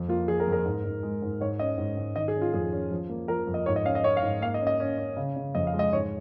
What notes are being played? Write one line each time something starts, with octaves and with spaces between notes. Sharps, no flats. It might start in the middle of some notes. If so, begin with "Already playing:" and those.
Already playing: F2
A#3 F4
F3 G#4
A#4
F2
A#4
G#2
G#2
G#3
G#2
G#2 C#5
C#4 D#5
G#2
G#2
D#3 D#5
G#4
C#4
F4
F2 G#4
C#4
F3
A#3
F3 A#4
F2
D#5
G#2 C#5
D#5
C#4 F5
D#5
C#4 C#5
F5
G#2
A#3 F5
D#5
C#4
D#5
C#4
C#4
C#3
C#3
F2 D#5
F5
G#3
D#5
G#2 C#5